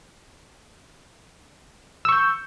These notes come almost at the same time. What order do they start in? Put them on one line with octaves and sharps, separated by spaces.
E6 C#6 G6